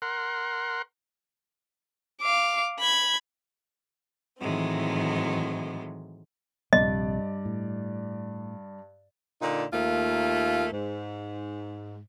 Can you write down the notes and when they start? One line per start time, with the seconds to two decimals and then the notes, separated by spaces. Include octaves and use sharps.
0.02 A#4 F#5 C6
2.22 F5 D6
2.80 B5 G#6
4.40 A2 D#3 E3 F#3 G#3 C4
6.73 A#1 G2 C3 D5 D#5
7.45 A2
9.42 A#2 D3 D#4
9.73 D#2 A3 A#3 F4
10.71 G#2